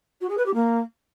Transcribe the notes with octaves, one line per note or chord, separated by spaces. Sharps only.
F#4
G#4
B4
G4
A#3